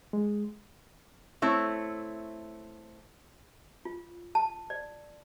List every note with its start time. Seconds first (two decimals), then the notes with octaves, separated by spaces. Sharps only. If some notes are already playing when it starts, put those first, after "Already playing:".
0.13 G#3
1.42 A3 C4 E4 C#5
3.85 F4
4.35 A5
4.70 D5